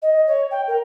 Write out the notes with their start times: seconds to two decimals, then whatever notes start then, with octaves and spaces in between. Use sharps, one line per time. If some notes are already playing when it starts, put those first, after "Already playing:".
0.02 D#5
0.27 C#5
0.51 G5
0.67 A#4